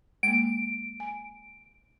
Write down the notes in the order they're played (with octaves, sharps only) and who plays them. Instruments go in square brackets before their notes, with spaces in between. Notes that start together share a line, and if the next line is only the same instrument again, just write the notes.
[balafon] G#3 A#3 [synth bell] D7
[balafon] G#5